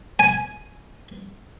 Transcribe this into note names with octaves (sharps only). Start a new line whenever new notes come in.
G#5